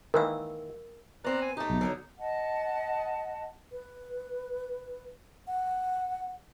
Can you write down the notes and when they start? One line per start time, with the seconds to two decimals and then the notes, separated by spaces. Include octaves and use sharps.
0.14 D#3 E3 A#3 A#4 E6
1.24 B3 C4 D5 A#5 F#6
1.42 G#5
1.57 A3 D#4 G4
1.70 B1 B2
1.81 D3 F3 F#3
2.19 D#5 F#5 A5
3.72 B4
5.47 F#5